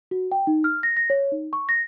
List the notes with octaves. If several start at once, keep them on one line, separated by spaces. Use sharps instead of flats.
F#4
G5
D#4
F6
A#6
A#6
C#5
D#4
C#6
A#6